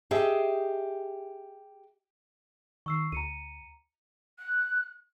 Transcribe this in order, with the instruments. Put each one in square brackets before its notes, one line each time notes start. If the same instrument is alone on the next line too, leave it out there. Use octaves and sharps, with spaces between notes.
[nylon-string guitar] G4 G#4 D#5 E5
[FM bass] D#3 [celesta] C#6 E6 C7
[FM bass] D2 [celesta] A#5 C#7 D#7
[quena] F#6